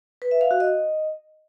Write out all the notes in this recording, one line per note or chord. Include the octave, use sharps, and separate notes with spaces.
B4
E5
F5
F#4
D#5